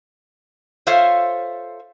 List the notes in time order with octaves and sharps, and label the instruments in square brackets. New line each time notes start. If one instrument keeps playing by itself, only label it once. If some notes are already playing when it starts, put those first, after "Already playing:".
[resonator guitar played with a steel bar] F4 A4 C5 C#5 E5 F5